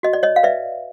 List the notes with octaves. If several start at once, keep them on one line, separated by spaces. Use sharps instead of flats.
F#4 D#5
D5
C#5 D#5
F5
B4 D5 E5